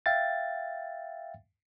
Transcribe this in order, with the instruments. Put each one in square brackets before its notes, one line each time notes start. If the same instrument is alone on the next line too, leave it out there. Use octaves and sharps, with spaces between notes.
[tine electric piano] E5 F5 G5 A6